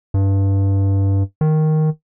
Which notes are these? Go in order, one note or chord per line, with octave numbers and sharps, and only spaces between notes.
G2
D#3